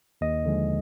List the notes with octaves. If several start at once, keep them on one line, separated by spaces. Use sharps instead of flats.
D#2 D#5
D3 F3 G#3